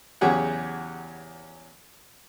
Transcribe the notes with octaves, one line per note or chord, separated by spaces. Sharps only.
E2 C#3 F#3 G4 G#4 F#5